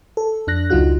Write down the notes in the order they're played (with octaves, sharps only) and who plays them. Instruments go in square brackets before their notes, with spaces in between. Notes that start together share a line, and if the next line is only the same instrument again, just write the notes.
[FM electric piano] A4
F2 D4 F#6 A#6
C#2 F#3 D#4 F4 F#4 F#6